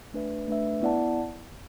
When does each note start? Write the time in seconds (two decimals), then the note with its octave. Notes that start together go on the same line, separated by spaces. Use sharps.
0.14 A3 D4 B4 E5
0.48 A3 D4 B4 E5
0.82 B3 E4 D5 F#5 A5